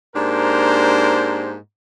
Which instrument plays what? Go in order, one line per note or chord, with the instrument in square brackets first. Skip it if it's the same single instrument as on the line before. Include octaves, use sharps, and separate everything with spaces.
[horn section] G#2 A#3 D4 G4 A#4 C5